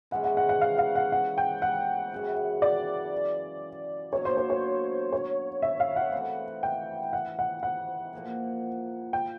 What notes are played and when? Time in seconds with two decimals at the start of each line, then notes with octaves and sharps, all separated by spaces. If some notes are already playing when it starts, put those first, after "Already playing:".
0.11 E3 G#3 C#4 F#5
0.24 F#5
0.37 F#5
0.49 F#5
0.61 F5
0.78 F5
0.95 F#5
1.12 F#5
1.38 G5
1.62 F#5
2.12 F#2 C#3 E3
2.62 D5
4.12 B2 F#3 A#3 D4 C#5
4.25 C5
4.37 C#5
4.50 C#5
5.13 C#5
5.62 E5
5.80 F5
5.96 F#5
6.12 E3 A3 C4
6.63 G5
7.13 F#5
7.39 F#5
7.63 F#5
8.13 A#2 F3 A#3
9.13 G5